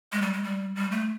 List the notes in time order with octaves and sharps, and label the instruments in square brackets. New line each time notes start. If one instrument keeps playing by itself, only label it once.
[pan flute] G#3
G3
G#3
G3
G3
A3